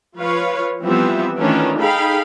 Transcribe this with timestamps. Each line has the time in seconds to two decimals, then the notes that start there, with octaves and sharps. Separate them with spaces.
0.17 F3 F4 B4 C#5 F5
0.83 E3 F3 G3 B3 C4 E5
1.37 D#3 E3 A3 C#4 D4 F4
1.79 D#4 G#4 A4 F5 G5 B5